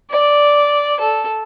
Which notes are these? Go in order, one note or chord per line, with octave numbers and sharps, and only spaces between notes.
D5
A4